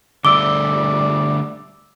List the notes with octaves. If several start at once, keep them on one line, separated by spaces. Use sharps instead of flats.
D3 G3 A3 D5 D6 E6 G7